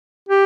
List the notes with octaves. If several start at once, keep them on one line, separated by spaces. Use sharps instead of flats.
G4